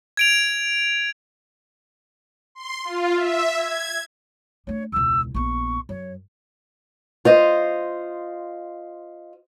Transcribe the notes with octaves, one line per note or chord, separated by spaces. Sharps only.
G#6 D7 F7
C6
F4
E5
G#6
A3 D4 C#5
E1 C#2 E6
A#1 B3 C#6
F#2 C#5
F4 C5 D#5